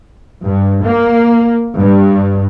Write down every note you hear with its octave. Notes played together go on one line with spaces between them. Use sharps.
G2
A#3
G2